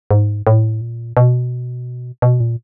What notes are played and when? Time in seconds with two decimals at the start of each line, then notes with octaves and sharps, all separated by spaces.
0.11 G#2
0.47 A2
0.81 A#2
1.17 B2
2.22 B2
2.40 A#2